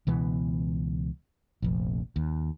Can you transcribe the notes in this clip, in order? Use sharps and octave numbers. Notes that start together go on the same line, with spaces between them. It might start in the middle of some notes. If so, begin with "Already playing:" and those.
C#2 B2 E3 B3
F1 A#1
D#2